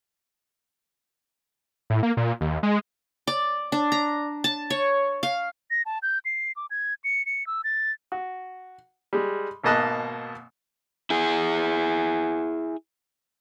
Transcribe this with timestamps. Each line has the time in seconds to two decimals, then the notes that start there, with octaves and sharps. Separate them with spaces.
1.90 A2
2.03 A#3
2.17 A#2
2.41 D#2
2.63 G#3
3.27 D5
3.72 D4
3.92 A#5
4.44 A5
4.70 C#5
5.23 F5
5.71 A#6
5.86 A5
6.03 G6
6.25 C7
6.56 D6
6.71 G#6
7.04 C#7
7.26 C#7
7.47 E6
7.64 A6
8.12 F#4
9.13 G3 G#3
9.64 G#1 B2 A#3 D#5 A5 F#6
11.10 E4 G#4